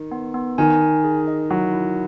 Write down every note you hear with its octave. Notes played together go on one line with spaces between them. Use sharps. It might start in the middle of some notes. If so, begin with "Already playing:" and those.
Already playing: D#3
B3
B3
D#3 G#5
G#5
G#4
D#5
F#3 E4
E4